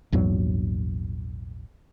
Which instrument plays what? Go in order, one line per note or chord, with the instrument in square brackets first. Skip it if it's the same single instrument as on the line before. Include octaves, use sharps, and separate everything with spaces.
[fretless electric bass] A#1 E2 G#2 F#3